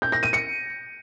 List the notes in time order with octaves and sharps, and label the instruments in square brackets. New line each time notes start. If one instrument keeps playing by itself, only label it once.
[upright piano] G6
A#6
D#7
C#7